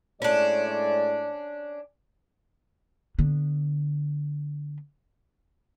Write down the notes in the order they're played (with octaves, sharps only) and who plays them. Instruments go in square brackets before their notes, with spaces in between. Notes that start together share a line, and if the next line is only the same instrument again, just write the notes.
[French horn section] A2 G#3 D5 [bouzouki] C#4 D4
[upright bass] D3 B3